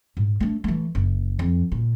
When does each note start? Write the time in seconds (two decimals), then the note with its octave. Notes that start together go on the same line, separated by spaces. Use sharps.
0.17 G#2
0.40 A3 D4
0.64 E3 A3
0.95 F#1
1.39 F2
1.72 A#2